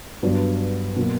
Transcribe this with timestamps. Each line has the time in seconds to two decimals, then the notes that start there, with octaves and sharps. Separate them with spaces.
0.23 G2 F#3 B3 D4
0.96 B2 F#3 A#3